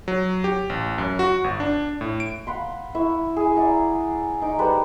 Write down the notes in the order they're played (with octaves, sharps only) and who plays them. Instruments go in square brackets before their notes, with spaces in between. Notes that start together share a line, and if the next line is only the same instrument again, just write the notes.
[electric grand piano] F#3
G4
A1
F#2
F#4
G1
D4
A2
D7
[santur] F5 F#5 B5 C6
E4 E5 C#6
G#4 G#5
D5 E5 F#5 A#5
D#4 C#5 D6
G3 A4 B4 C5